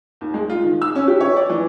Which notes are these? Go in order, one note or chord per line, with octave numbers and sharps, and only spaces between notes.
D#2
G#3
F4
D#3
E6
C#4
G4
C#5
D5
E3